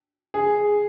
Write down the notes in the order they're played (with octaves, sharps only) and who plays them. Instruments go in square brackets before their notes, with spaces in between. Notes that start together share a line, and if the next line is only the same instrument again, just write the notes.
[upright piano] G#4